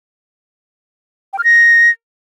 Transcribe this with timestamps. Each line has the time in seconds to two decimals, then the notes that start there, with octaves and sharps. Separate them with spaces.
1.33 G5
1.39 F6
1.44 A#6